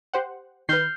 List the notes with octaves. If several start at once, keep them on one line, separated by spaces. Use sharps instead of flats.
G4 C5 F#5
D#3 B4 F6 G6 C7